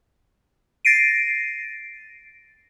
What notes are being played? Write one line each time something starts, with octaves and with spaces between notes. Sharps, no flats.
A6 A#6 C7 D7 D#7